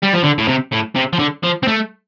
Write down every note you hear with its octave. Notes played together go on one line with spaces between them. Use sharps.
G3
F3
D3
A2
C3
A2
C3
F3
D3
F3
C4
A3